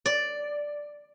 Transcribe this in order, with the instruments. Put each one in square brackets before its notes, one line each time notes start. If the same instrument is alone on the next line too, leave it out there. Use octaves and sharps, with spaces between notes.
[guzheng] D5